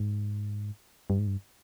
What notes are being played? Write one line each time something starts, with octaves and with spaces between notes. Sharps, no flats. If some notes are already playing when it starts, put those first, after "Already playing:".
Already playing: G#2
G2
G#2
G2